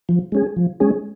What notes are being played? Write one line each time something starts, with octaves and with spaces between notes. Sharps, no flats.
F3
G#3 C#4 G#4
F3
G#3 C#4 G#4